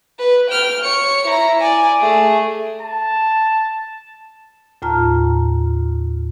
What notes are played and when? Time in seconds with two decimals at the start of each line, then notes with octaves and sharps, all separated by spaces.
0.19 B4
0.50 G5 F6
0.82 C#5 C#7
1.27 E4 A#5
1.60 D5 G#5
2.00 A3 G#4
2.82 A5
4.82 D#2 A2 F4 A5 A#5 F6